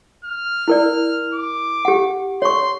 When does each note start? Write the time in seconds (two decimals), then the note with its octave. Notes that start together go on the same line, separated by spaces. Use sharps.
0.25 F6
0.68 E4 A#4 D5
1.34 D6
1.85 G4 F#5
2.42 C#5 C6 C#6